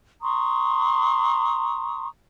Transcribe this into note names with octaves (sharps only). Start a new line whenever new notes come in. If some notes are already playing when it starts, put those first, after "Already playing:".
A#5 C6 C#6 D#6